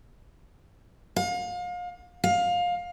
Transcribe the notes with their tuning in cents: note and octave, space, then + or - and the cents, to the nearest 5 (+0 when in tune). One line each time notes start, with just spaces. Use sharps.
F5 +35
F5 +20